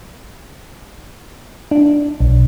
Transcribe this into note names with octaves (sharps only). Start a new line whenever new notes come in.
D4
B1